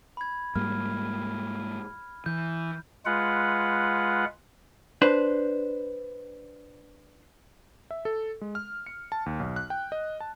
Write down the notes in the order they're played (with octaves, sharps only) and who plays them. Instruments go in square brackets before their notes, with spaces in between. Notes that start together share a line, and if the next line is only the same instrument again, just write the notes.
[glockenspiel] B5 G#6
[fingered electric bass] G#2 G3 A#3 [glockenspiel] F6
[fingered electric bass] E3 [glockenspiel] G6
[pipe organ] G#3 F4 B4 F#5
[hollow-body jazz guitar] D4 B4 C5
[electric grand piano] E5
A4
G#3
F6
C#7
A5
D#2
B1
F#6
G5
D#5
A5